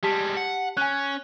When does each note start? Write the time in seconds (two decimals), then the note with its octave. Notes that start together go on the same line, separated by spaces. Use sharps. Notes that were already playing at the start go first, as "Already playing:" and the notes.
0.03 G3 G#3 G4 A5 B6
0.37 F#5
0.77 C#4 G#5 F#6